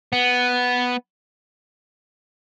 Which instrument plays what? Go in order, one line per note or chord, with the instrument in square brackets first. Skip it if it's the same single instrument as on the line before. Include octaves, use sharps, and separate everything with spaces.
[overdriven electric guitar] B3